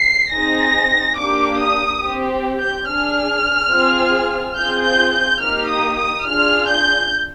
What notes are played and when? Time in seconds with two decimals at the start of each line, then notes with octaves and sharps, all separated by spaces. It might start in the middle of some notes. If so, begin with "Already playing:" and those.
Already playing: C7
0.33 C4 D#4 G#4 A#6
1.18 A#3 D4 G4 D6
1.61 D#6
2.02 C4 G4
2.59 G6
2.88 D4 G#4 F6
3.73 C4 F4 G#4
4.57 C4 F4 G#4 G6
4.85 G6
5.15 G6
5.42 A#3 D#4 G4 F6
5.71 D#6
5.98 D#6
6.27 D4 F4 G#4 F6
6.69 G6